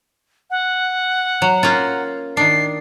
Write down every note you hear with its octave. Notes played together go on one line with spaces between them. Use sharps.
F#5
F#3
A#3 C#4 F4
D#3 D4 C7